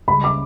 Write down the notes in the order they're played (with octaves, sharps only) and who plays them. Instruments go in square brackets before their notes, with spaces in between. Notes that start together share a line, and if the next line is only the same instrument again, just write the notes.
[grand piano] C#2 C#3 G3 B5
D6